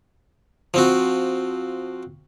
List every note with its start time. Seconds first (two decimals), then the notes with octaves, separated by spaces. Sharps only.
0.74 F3 C4 F#4